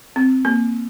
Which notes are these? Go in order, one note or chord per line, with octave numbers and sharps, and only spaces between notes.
C4
A#3